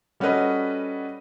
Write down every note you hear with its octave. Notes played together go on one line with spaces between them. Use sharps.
G3 C#4 F#4 A4 B4 D#5